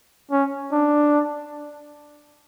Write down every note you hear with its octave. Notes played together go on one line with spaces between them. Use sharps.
C#4
D4